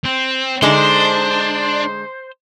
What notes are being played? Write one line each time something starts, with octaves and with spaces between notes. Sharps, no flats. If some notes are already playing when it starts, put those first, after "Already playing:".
C4
D3 G#3 D4 D#4 C5